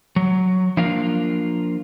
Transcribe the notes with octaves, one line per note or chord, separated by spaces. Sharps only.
F#3
F3 A#3 D4 F4 A#4 F5